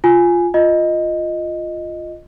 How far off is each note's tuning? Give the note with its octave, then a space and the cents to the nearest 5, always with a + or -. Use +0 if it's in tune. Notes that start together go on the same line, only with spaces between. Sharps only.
F4 +0 G#5 +0
F4 +0 D#5 +0